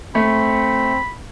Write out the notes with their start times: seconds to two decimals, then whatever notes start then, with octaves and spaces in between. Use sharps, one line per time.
0.15 A3 C4 B5